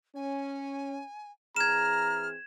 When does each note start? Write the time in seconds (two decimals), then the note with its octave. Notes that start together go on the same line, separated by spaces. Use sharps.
0.16 C#4 G#5
1.56 E3 C4 G#4 A#5 F6 G#6 E7